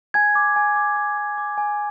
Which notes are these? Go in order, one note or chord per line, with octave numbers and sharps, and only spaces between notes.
G#5 G#6
D6
G#5
D6
D6
D6
D6
G#5